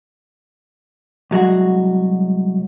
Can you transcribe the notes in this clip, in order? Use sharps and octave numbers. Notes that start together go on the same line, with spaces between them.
C2 F#3 G#3 F#4